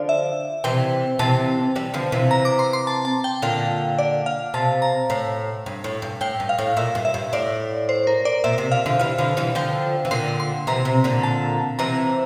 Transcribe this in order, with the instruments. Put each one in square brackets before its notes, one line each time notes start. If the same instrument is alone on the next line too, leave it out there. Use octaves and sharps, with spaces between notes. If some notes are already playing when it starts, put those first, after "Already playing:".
Already playing: [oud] D3 F3 [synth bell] D5
[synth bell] E5
[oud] C3 E3 [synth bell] G5
[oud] C3 E3 [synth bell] A5
[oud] E3 G3
D3 F3
C3 E3
[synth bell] A#5
D6
C6
C6
A5
A5
G5
[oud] A#2 D3 [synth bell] F5
[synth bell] D5
F5
[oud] C3 [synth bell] A5
[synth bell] A#5
[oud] A2
G2
A2
G2
[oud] A2 [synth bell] G5
[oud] G2
[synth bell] F5
[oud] A2
[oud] A#2 [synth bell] E5
[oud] G2
[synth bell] E5
[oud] G2
[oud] A2 [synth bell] D5
[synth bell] C5
A#4
D5
[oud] A#2 [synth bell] E5
[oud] C3
[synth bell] F5
[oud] D3 F3
[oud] E3 G3 [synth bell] F5
[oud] D3 F3
E3 G3
[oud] D3 F3 [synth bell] G5
[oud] E3
[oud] A#2 D3 [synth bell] C6
[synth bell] C6
[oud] C3 E3 [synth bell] A#5
[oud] C3
A#2 D3
[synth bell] A5
[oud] C3 E3 [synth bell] A#5